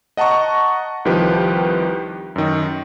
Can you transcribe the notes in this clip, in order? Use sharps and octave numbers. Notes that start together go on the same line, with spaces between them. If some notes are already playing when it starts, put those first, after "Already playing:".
D#5 F#5 A5 A#5 C#6
C2 D#3 F3 G4 B4
F#2 D#3